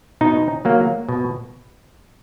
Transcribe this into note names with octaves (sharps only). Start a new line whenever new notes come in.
B2 D#4
F#3 A#3
B2